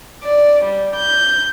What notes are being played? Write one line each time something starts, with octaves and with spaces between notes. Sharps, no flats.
D5
G3
G6